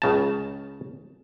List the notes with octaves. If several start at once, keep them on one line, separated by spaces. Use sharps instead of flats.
C#2 C#3 A5